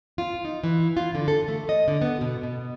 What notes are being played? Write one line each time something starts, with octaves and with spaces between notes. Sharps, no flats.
F4
D#4
E3
F4
D3
A4
A3
D#5
D3
B3
B2
B2